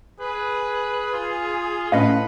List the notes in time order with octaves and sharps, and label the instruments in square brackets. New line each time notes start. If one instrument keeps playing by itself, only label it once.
[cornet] G#4 [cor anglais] B4
[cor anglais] F4
[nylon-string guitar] A2 [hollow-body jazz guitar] C#4 D#5 F5 [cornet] B4